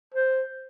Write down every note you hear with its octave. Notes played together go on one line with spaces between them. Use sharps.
C5